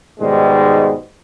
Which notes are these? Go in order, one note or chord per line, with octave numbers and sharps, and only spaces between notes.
G#2 B2 D#3 G3 G#3